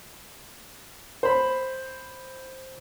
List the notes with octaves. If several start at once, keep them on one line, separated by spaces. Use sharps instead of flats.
C5 B5